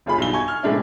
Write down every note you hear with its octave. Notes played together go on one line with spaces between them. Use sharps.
G1 F4 G#4 B5
B1 G2 G7
G#5 C#6 G#6
F6
A2 C3 G#3 C#4 D4 E4